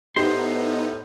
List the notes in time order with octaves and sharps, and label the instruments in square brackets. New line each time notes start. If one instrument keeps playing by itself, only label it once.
[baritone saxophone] A2 [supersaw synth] B3 D#4 [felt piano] G4 [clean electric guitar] C5 C6